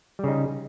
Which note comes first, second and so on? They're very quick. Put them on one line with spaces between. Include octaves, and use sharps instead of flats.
G3 C#3 D#4